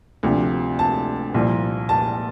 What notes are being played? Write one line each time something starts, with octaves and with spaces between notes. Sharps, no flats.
D2 C3 F3
A5
C2 A#2 F3
A5